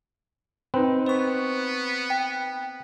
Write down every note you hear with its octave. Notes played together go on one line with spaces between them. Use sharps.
C4 D#4 B4
B3 C5 C#6
G5